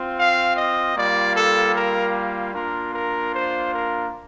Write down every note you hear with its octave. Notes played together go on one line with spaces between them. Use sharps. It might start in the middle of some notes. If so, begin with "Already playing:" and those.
Already playing: C4 F4
F5
D#5
G3 A#3 F4 D5
A4
A#4
A#3 D4 F4 A#4
A#4
C5
A#4